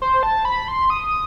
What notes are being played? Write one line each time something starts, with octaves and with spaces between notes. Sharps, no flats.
C5
A5
B5
C6
D#6